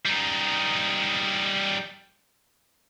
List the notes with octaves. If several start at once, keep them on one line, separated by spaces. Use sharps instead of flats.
G3 D#4